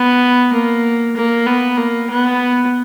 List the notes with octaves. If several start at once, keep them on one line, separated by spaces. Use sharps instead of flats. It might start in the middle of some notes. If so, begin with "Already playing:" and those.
Already playing: B3
A#3
A#3
B3
A#3
B3